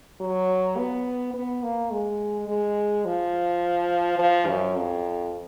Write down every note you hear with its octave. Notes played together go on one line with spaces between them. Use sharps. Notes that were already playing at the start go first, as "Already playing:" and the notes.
F#3
B3
B3
A#3
G#3
G#3
F3
F3
F#2
F2